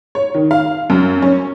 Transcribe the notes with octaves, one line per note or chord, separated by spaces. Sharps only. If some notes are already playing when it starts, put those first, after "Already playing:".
C#5
D#3
F5
F#2
C#4